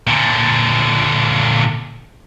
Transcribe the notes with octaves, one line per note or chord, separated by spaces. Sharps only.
A#2 D3